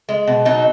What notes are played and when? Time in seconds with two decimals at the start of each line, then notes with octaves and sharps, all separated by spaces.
0.09 G#3
0.27 B2
0.45 F#3 D#4